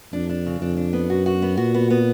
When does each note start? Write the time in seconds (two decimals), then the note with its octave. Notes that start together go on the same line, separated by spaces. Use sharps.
0.13 F2 D4
0.29 D4
0.46 C#3
0.61 F2 D4
0.77 D4
0.93 B3
1.09 F#2 F#4
1.26 F#4
1.42 B3
1.57 A#2 F#4
1.74 B3
1.90 B3